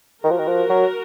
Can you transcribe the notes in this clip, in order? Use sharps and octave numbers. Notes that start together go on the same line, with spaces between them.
D#3 F#4 A#4
F3
D#3
F3
F#3